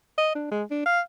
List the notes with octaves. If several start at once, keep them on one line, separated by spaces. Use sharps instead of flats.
D#5
D4
G#3
D4
F5